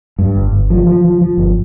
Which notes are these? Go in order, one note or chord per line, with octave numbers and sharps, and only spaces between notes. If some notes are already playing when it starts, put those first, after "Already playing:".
G2
G1
G1
F3
F3
F3
F3
G1